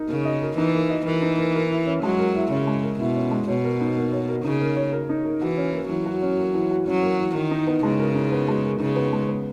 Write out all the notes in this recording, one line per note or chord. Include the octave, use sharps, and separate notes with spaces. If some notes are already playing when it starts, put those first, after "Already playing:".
Already playing: D#4 A#4
C#3 A#3
D#5
A#4
E3 D#4
A#3
D#5
E3 A#4
D#4
A#3
A#4
E4
C#4
F#3 G#3
A#4
E4
C#3 C#4
G#3
A#4
B2 E4
C#4
G#3
B2 C#5
A#4
D#4
A#3
C#5
A#4
C#3 D#4
A#3
C#5
A#4
D#4
A#3
E3 F#4
C#4
A#3
E3 F#3
F#4
C#4
A#3
E3
F#4
F#3 C#4
A#3
E3
D#3 A#4
D#4
B3
C#3 G#3
A#4
D#4
B3
G#3
A#4
C#3 D#4
B3
G#3
B3